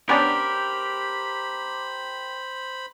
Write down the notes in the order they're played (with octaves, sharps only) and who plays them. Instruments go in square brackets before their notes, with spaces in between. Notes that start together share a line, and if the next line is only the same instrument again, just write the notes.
[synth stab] B3 C#4 D4 [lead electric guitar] G4 A#4 [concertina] C5 B5 [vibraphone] D6